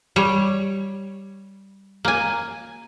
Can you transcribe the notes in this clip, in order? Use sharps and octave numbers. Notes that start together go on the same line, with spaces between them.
G3 C#5
A#3 G#5